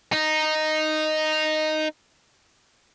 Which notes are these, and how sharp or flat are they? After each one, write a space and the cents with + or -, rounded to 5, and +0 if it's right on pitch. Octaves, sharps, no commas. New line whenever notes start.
D#4 -5